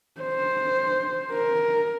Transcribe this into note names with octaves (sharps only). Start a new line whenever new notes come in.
C5
A#4